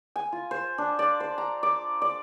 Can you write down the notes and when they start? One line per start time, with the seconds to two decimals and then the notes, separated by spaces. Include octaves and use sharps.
0.16 G#5
0.32 F4
0.51 C5
0.78 D4
0.99 D5
1.20 C5
1.38 A#5
1.63 D5
2.02 D5